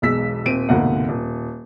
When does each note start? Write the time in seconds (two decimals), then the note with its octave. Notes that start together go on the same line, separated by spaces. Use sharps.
0.02 E1 B1 G#3 E6 B6
0.45 D#1 C4 D7 D#7
0.69 F1 D2 G#2 B2 A#3 F#5
1.09 D#1